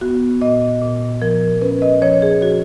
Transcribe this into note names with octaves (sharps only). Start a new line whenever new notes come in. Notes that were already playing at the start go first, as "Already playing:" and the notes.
B3 F#4
A#2 D#5
A#2
F3 A#4
C#4 B4
D#5
F3 C#5
G#4
F3 F#4